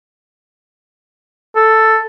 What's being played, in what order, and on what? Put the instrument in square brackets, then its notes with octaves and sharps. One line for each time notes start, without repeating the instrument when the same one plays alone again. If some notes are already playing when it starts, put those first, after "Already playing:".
[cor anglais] A4